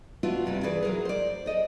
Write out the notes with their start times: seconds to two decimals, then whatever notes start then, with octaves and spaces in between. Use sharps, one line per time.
0.23 B3 D4 F4 F#4 E5
0.46 G2 C3 G3
0.63 E3 G#4 B4 D5
0.83 F#3 G#4 A#4
1.05 C5 D5
1.46 A4 D#5